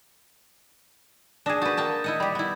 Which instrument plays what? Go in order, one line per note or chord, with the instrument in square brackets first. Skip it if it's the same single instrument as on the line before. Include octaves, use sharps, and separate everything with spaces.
[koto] D4 G#4 [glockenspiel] D#6 A#6 E7
[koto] F#4 B4 [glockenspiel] D#6 G6 A6
[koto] A#3 G5 A5
E4 D#5 F#5
[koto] G3 G4 [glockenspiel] B5
[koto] B3 E4